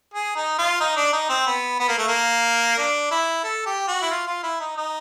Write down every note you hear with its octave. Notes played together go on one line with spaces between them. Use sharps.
G#4
D#4
F4
D#4
D4
D#4
C4
B3
B3
A#3
A3
A#3
D4
E4
A4
G4
F#4
E4
F4
F4
E4
D#4
D#4